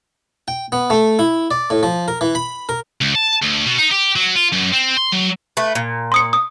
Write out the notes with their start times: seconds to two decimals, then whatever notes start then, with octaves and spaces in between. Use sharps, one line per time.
0.48 G5
0.72 B3
0.90 A3
1.19 E4
1.51 D5
1.70 A2
1.83 F3
2.08 A#4
2.21 E3
2.35 B5
2.69 A#4
3.01 C#2
3.15 A5
3.42 D2
3.66 B2
3.78 D#4
3.91 G4
4.16 F#3
4.36 F4
4.53 F#2
4.73 C4
4.97 C6
5.13 F#3
5.57 A3 B4
5.75 A#2
6.12 C6 D#6 C#7
6.33 D#6